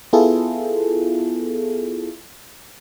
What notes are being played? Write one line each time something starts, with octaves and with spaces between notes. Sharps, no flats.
B3 E4 F4 G#4 A4